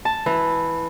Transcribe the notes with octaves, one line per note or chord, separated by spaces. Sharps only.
A5
E3